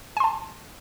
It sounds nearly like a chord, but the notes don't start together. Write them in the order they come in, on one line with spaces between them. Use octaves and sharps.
G#5 C6 A5